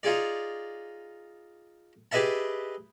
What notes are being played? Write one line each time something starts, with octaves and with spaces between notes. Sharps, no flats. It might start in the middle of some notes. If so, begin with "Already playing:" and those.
D#4 F4 G#4 D5
G4 G#4 B4 D#5 E5 A5